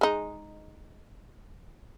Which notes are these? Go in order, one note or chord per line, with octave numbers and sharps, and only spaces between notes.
G#3 D#4